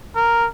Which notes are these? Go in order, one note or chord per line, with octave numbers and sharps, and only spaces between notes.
A#4